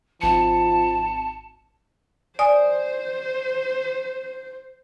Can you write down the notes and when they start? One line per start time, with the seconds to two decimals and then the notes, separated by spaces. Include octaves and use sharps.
0.21 G#1 F3 A5 C#7
2.39 C5 D5 G#5 D#6